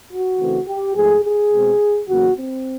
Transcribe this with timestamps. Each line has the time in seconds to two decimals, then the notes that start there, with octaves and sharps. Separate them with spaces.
0.12 F#4
0.39 C#3 E3 A3 C4
0.68 G4
0.95 G#2 F3 A3 G#4
1.24 G#4
1.52 B2 G#3 C4
2.08 E2 C#3 F#3 A#3 F#4
2.36 C4